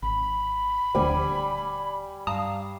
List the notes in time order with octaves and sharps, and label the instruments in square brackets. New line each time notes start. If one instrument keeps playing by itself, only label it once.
[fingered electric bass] G#1 [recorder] B5
[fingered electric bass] D#1 D3 D4 [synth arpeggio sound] D2 F3 [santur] G3 G#5
[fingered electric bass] G2 [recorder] F5 [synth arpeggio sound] A5 A#5 D#6